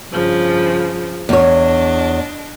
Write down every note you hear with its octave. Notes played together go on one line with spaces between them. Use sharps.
G2 C#3 F3
E2 D4 C#5 D#5